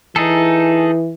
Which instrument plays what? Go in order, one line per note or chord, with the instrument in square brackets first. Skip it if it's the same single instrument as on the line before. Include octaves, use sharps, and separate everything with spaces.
[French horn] E3 [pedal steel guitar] D#4 G#4 A4